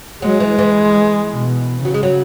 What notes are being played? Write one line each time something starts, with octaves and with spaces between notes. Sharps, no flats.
F#3 G#3
E3
E3
B2
C#3 F#3
G#3
F#3